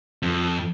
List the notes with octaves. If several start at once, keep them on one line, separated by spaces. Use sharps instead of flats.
F2